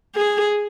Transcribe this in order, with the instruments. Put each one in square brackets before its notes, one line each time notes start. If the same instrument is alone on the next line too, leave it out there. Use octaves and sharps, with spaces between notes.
[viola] G#4